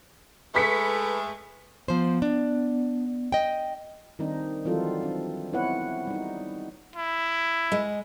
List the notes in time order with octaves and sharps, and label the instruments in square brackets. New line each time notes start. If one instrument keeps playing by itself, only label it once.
[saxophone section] G#3 A3 [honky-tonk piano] B4 B6 C#7
[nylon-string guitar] F3 C5 [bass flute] B3
[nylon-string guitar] D4
D#5 G5
[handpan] D#3 G3 C4 D4 D#4
E3 F#3 G3 C4 F4 A4
C4 D4
B3 C4 E4 B4 C#5 F#5
G3 D#4
[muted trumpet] E4
[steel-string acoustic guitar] G#3